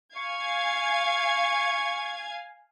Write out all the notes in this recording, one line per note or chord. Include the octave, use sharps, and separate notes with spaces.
F5 G#5 C#6 G#6